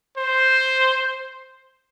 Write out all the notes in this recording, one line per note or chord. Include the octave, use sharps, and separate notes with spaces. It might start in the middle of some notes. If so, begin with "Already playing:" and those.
C5